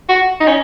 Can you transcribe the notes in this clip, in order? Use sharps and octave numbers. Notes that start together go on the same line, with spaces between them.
F#4
D#4
C#4